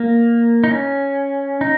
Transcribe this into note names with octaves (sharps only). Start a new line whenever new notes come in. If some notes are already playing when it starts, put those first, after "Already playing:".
Already playing: A#3
D#4
C#4
D#4